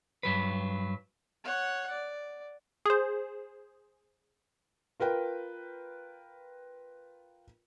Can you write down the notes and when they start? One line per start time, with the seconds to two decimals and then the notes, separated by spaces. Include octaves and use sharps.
0.23 G2 F#3 B4
1.44 C#5 F#5
1.90 D5
2.86 G#4 C5
5.00 F4 A#4 B4 G5